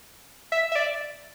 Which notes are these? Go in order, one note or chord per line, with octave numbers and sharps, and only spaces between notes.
E5
E5
D5